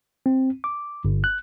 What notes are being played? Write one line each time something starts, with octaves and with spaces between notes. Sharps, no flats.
C4
D6
G1
F#6